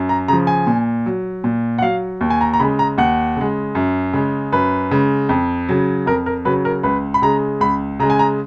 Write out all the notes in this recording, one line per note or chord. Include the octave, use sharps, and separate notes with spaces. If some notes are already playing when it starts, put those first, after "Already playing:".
Already playing: F#2
A#5
C#3 F3 A#5
G#5
A#2
F#3
A#2
F#5
F#3 F5
D#2
G#5
A#5
A#5
C#3 G#3 B5
A#5
D#2 F#5
C#3 G#3
F#2
C#3 G#3
F#2 B4
C#3 G#3
F2
C#3 F#3
F2 A#4
A#4
C#3 F#3 B4
A#4
C#2 B4
B5
C#3 G#3 A#5
C#2 B5
C#3 G#3 A#5
G#5
A#5